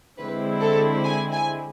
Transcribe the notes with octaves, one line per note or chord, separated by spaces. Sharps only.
D3 G#3 C4 E4 B4
A4
G#5
G#5